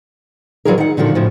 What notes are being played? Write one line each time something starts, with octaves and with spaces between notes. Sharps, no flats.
E3 F#3 D4 F4 G#4 A#4
D#3 F#5
A#2 D3 D#3 F3 F#4
A2 C#3 F3